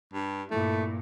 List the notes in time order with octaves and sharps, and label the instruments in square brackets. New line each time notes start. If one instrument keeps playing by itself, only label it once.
[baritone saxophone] G2
[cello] G2 A#2 [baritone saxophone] A3 [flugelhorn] E4